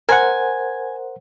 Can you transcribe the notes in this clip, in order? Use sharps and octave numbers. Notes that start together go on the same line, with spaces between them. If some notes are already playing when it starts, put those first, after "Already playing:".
A#4 C5 F#5 G#5